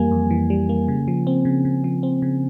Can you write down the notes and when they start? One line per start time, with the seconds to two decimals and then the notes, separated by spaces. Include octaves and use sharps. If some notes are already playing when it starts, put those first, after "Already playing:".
Already playing: F2 E3 G3 A#3 G#5
0.12 F2
0.31 E3
0.50 G3
0.69 A#3
0.88 C#3
1.08 F3
1.27 C4
1.45 C#3
1.65 C#3
1.84 F3
2.03 C4
2.22 C#3